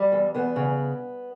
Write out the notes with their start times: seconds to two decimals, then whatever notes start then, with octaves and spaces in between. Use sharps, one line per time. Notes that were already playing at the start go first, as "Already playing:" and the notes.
Already playing: G3
0.12 E2
0.34 E2 B3
0.56 C#3